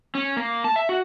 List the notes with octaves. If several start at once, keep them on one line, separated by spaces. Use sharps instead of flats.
C#4
A#3
A5
E5
F#4